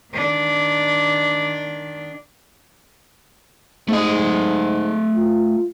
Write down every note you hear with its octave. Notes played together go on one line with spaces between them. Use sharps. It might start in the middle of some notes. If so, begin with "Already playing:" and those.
D#3 D4
G#2 A3 D#5
F4